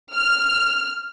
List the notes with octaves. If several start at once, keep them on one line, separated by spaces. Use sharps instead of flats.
F6